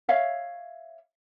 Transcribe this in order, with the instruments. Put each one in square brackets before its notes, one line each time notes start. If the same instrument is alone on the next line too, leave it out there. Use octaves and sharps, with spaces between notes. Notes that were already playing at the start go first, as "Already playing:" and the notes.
[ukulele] C#5 E5 F5